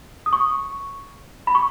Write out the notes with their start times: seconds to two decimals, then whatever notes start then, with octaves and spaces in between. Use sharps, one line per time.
0.26 D#6
0.33 C#6
1.47 B5
1.55 C#6